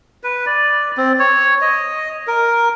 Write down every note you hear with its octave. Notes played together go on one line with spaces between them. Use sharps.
B4
D5
C4
C#5
D#5
A#4